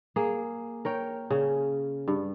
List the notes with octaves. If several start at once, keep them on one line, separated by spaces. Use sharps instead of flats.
A#3 G#4
A#4 C#5 G5
C#3 C#4
G2